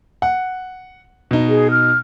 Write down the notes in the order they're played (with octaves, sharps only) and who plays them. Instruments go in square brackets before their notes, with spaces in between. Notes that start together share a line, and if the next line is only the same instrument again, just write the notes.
[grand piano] F#5
B2 D#4
[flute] G#4
F6